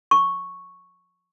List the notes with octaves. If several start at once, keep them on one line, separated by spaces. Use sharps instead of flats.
C#6